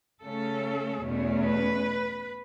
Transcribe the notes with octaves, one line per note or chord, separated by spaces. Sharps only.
C#3 A3 C#4 A4
E2 B2 A3 C#4
B4